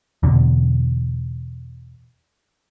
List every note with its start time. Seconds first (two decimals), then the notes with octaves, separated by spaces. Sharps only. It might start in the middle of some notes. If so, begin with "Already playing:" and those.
0.23 E2 B2 D3